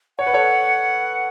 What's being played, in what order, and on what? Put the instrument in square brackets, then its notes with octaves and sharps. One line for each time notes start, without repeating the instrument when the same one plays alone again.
[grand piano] C#5 [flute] F#5
[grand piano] B4
A4 C#5